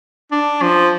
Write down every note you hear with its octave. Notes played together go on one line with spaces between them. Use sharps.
D4
F3